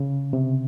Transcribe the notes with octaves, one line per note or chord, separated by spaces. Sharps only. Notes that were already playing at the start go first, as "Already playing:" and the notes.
Already playing: C#3
C3